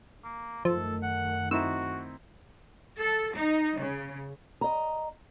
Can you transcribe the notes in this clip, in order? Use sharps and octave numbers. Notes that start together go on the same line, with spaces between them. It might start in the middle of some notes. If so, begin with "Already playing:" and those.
A#3
F#2 D#3 F3 A3 A4
F#5
C4 D#4 E4 F#4 E6
A4
D#4
C#3
D#5 A#5